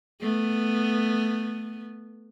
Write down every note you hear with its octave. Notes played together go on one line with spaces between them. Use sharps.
A3 B3